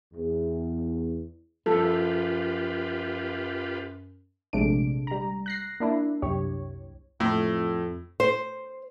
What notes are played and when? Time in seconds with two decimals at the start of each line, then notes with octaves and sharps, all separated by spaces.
0.14 E2
1.66 F#2 F3 F4 G4 A4 B4
4.53 A#1 C3 G#3 A3 D4 D7
5.07 G3 A#5
5.46 F#6 A#6 C7
5.80 A#3 D4 E4
6.22 C2 F#2 G4 C#5
7.20 F2 A2
8.20 C5